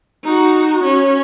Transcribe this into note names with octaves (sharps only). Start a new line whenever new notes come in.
D#4 F#4
C#4